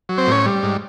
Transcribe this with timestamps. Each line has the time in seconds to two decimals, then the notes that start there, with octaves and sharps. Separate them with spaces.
0.09 F#3
0.18 C4 C5
0.27 A2 C#4 C#5
0.46 G3
0.63 G#2